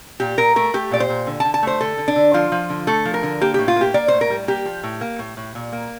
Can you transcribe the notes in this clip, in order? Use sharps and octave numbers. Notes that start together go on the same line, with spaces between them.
A#2 G4
A#2 A#4
A3 A#4
A3 G4
A#2 D5
C5
A#2
D3
A5
D3
A5
A3 C5
D3 A4
D3
D4
D3
F3 F4
F3
D3
A3 A4
F3
A#4
D3
A#3 G4
A2 G4
F4
A#3 G4
A#3 D5
A2 C5
A#4
G3
A#3 G4
F3
A2
A#3
A2
A2
A#2
A#3